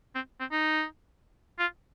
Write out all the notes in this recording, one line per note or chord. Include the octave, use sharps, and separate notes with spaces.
C4
C4
D#4
F4